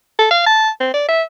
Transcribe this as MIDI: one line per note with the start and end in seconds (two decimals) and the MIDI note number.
0.19 0.29 69
0.31 0.43 77
0.46 0.70 81
0.80 0.94 60
0.94 1.06 74
1.08 1.22 76